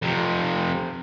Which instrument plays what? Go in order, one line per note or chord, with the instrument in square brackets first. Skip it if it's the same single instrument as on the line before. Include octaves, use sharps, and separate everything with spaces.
[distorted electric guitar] F2 C3